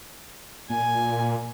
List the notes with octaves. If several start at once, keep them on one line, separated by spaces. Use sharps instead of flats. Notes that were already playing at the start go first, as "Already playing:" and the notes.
A#2 G#5